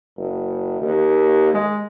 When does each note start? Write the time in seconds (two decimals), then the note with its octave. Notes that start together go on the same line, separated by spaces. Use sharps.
0.17 F#1
0.81 D#2
1.54 G#3